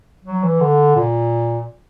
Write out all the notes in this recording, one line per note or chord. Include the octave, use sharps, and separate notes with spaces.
F#3
E3
D3
A#2